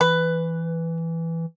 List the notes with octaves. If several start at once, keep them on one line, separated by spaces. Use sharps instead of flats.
E3 B4